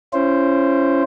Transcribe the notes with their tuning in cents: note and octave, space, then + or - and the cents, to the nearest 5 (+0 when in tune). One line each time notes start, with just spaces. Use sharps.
C#4 +0 E4 +40 C5 +0